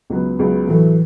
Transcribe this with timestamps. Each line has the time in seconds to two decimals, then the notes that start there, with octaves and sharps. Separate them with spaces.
0.10 C#2 C#3 F#3 B3
0.39 C#2 C#3 F#3 B3
0.67 A2 E3 F#3 A3